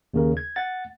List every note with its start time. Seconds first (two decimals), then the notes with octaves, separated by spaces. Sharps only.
0.14 D#2 C#3 A#4
0.37 G#6
0.56 F#5 A6